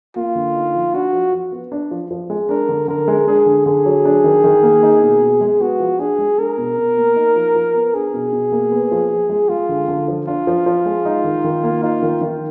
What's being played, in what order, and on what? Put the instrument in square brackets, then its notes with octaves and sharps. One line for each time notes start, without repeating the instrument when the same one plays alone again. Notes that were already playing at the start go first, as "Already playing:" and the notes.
[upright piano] A#3 [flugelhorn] F4
[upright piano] D3
D#4
F3
[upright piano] D4 [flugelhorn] F#4
[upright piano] F3
F3
B3
D4
F3
F3
G#3
[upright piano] D4 [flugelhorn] A#4
[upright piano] D3
[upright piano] D3 [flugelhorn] A#4
[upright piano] G#3
[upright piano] D4 [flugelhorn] G#4
[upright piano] D3
[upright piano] D3 [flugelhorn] G#4
[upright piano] F#3
D4
D#3
D#3
A#3
D#4
B2
B2
G#3
[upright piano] B3 [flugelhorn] F#4
[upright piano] F3
[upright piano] D4 [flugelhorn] G#4
[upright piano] G#3
[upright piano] D4 [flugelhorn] A#4
[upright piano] B2
B2
A#3
D#4
F3
F3
B3
[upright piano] D4 [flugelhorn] G#4
[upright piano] B2
B2
A#3
B3
F3
F3
G#3
[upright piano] G#3 [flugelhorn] F4
[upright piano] D3
D3
F3
[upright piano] D4 [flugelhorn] F4
[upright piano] F3
F3
G#3
D#4
D#3
D#3
A#3
[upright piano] D#4 [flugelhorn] F4
[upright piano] D#3
D#3